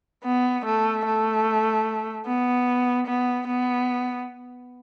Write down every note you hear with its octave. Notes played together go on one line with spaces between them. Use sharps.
B3
A3
A3
B3
B3
B3